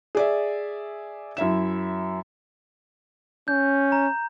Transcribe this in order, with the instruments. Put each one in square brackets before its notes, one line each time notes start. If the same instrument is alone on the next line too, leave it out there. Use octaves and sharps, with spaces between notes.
[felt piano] G#4 D5 E5
F#2 E4 E5 E7
[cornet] C#4 [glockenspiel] G6
[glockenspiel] A#5